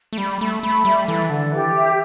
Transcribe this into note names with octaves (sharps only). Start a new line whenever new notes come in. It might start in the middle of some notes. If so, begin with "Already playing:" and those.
A3
G3 B5
A3 B5
A3 B5
G3 E5
E3 A4
D3 A4
E3 G4
E5